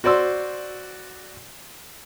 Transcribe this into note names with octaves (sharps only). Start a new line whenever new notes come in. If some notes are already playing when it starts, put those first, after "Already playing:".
F#4 C5 D5 C6 E6